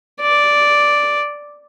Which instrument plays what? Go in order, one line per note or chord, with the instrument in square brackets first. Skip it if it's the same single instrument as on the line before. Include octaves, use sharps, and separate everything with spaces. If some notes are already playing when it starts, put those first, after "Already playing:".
[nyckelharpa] D5